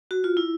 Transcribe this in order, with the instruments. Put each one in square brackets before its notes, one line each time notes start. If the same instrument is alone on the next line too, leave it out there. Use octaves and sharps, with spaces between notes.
[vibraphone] F#4
F4
E4